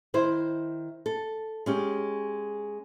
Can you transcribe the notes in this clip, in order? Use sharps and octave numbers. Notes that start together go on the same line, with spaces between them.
D#3 E4 C5
A4
G#3 C#4 G4